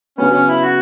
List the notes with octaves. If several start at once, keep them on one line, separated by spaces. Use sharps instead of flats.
C#3 F#3 B3 C#4
C#4
E4
F#4